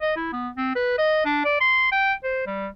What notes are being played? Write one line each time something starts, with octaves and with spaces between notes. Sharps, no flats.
D#5
E4
B3
C4
B4
D#5
D4
D5
C6
G5
C5
G3